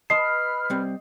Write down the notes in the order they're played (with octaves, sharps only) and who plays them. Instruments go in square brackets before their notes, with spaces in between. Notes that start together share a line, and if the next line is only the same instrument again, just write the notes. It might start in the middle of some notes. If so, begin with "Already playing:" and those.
[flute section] B4 B5 F6 [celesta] D#5 D#6 C7 [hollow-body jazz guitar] A5 C6
[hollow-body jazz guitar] G3 C4